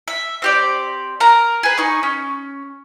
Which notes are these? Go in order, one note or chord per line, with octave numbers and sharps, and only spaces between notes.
E5
C4 G4 D5
A#4 A#5
G#4 B4
D#4 C#6
C#4